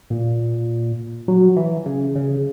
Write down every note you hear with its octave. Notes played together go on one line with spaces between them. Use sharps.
A#2
F#3
E3
C#3
C#3